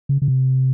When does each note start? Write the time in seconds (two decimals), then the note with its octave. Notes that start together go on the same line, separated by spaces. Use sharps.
0.09 C#3
0.22 C#3
0.28 C3